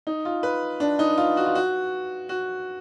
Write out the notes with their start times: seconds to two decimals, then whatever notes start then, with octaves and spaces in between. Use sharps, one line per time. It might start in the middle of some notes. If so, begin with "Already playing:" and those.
0.07 D#4
0.25 F4
0.43 B4
0.80 D4
0.99 D#4
1.18 F4
1.37 F#4
1.46 F4
1.55 F#4
2.29 F#4